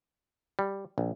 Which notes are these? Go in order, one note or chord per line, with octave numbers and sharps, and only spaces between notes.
G3
A#1